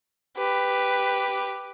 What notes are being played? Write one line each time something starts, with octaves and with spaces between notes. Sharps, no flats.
G4 B4